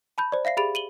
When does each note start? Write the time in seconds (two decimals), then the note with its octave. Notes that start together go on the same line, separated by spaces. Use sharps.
0.18 A5 B5 G6
0.32 C5 D5
0.45 E5 F5 A#6 C7
0.57 G4 G#4 B5 A6 D7 F7
0.75 D#7 F#7 G7